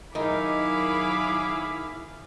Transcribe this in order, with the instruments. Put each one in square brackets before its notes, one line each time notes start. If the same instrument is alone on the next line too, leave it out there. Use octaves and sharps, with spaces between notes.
[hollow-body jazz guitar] D#3 D#4 [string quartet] F#3 G#4 F5 [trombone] E4 [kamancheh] B5 D6